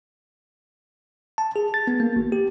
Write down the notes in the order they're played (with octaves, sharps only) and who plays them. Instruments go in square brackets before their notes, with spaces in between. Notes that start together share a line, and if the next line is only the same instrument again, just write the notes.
[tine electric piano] A5
G#4
A6
B3
A#3
G#1
G4